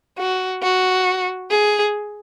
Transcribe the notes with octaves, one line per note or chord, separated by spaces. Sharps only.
F#4
F#4
G#4